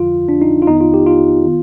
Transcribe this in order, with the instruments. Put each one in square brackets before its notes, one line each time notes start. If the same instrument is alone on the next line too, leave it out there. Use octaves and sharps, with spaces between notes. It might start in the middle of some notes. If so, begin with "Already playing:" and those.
Already playing: [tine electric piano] F2 D3 F3 F4
D4
D#4
F4
F2 D#3 B3 D#4
F4
G4
F4
D#3 B3